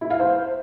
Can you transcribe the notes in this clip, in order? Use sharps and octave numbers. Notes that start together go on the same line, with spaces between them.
E4
F5
C5